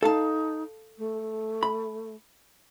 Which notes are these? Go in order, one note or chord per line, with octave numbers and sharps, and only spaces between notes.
D#4 A4 F5 A5
A3
B5